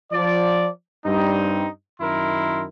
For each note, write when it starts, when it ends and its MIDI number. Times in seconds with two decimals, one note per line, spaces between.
0.12 0.69 53
0.12 0.69 74
1.06 1.66 43
1.06 1.66 55
1.06 1.66 60
1.06 1.66 63
2.01 2.65 42
2.01 2.65 51
2.01 2.65 64
2.01 2.65 70
2.01 2.65 84